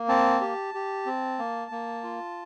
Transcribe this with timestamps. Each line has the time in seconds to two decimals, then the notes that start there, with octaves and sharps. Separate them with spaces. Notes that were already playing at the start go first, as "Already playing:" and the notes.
Already playing: A#3
0.08 C4 A5
0.41 G4
0.74 G4
1.06 C4
1.39 A#3
1.71 A#3
2.03 F4